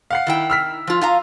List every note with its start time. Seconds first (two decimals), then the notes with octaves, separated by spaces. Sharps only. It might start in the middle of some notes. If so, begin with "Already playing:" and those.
0.11 F5 F#5 C7
0.27 D#3 E4 G5
0.50 E6 F6 B6
0.87 F3 F4
1.01 F4 F5 A#5